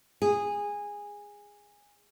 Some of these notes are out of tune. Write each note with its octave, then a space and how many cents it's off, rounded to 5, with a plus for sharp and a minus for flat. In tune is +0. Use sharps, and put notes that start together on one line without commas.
G#4 -15